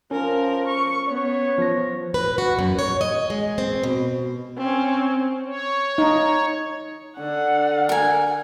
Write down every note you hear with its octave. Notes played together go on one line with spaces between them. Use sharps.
F3 C#4 A#4
C#6
B3 C#5
F3 A#6
B4
F#4
F#2
C#5
D#5
G#3
C4
B2
C4 C#4
C#5
D#4
D3 F#5
A#4 G#5